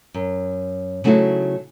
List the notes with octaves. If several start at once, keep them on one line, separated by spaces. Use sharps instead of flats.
F#2
C#3 F#3 A3 D#4 E4 F#4